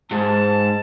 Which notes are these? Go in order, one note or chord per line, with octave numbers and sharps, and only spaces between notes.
G#2 A5